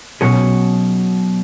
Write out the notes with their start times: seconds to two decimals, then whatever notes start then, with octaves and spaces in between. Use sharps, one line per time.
0.21 B2 F#3 C#4 G#4 C#5